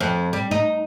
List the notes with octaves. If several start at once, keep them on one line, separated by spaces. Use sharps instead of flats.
F2
G3
D#4